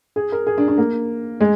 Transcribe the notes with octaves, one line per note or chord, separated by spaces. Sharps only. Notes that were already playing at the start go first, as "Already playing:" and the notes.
G#4
A#4
G#4
D4
D4
A#3
G#3